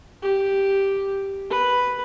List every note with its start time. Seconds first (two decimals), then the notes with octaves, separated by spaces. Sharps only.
0.22 G4
1.50 B4